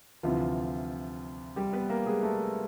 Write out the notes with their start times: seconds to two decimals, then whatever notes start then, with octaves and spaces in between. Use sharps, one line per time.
0.23 D2 C3 E3 F3 F4
1.56 G3 G4
1.73 B3 B4
1.90 A#3 A#4
2.06 G#3 G#4
2.23 A3 A4